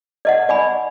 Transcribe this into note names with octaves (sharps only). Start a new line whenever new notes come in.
D5 D#5 F#5
D5 G#5 B5